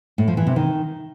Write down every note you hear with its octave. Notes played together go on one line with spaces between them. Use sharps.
A2
F3
E3
C3
D#3